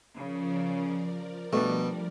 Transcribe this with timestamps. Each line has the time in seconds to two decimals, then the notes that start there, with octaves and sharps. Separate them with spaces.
0.16 C#3 F3 A#4 D5
1.53 B2 G3 A3 D4